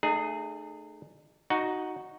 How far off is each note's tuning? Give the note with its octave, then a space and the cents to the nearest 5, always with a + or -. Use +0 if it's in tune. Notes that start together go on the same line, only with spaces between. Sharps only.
A3 +5 D#4 -40 G#4 +0
D#4 +0 F#4 +0 F#5 +0